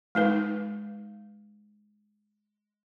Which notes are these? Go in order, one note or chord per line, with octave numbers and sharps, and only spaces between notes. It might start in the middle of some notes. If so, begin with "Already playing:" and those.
G#3 D#4 B4